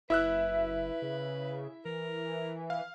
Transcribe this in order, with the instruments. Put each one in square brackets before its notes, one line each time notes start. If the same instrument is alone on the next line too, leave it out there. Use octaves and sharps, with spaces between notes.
[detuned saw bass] F#1 [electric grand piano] E4 E6 F#6 [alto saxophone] B4 [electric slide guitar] E5
[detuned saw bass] C#3
[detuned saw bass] E3 [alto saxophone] A#4
[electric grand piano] F5